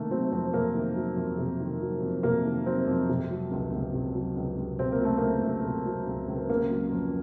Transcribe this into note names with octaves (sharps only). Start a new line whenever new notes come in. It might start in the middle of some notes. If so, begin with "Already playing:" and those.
Already playing: C3 D#3 A3 A#3
F#3 C4
F2 C4
C3 A#3
D#3
F#3
F2
C3
D#3
F#3
F2
C3 A#3
D#3
F#3 C4
F2
C3
F#3
C#2
C#2
C3
F#3
C#2
C#2
C3 C4
A#3
F#3 A3
C#2 A#3
C#2
C3
F#3
C#2
C#2
C#3 A#3
F#3
F2